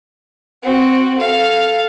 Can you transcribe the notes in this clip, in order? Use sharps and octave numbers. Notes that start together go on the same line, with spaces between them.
C4 F#4
A4 F5